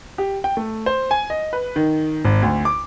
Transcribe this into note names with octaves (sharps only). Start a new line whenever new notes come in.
G4
G5
A3
C5
G#5
D#5
B4
D#3
G#1
D2
D6